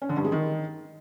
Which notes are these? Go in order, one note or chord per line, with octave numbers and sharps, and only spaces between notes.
C#4
D3
G2
G#3
D#3